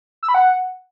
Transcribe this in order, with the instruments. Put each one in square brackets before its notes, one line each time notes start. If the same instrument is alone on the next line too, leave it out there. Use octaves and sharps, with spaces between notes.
[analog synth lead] E6
B5
F#5